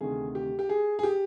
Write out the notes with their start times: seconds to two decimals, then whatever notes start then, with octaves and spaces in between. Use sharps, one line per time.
0.01 D2 C3 D#3 G#4
0.35 G4
0.59 G4
0.69 G#4
0.99 G#4
1.03 G4